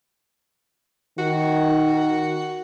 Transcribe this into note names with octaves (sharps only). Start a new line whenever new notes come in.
D#3 F#4